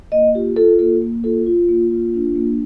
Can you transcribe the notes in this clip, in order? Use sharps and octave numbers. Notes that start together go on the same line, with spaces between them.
A#3 D#5
F4 G4
F4 A4
A#3 A4
A#3
F4 A4
F4
A#3
F4
D4
A#3